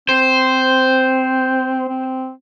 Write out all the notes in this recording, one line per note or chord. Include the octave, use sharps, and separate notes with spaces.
C4 C5
C4